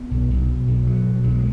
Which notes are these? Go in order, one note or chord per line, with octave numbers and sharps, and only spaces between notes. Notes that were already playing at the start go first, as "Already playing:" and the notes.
Already playing: B3
B1
B1
B2
B1
B2 F#3
B2
B1 F#3
G#3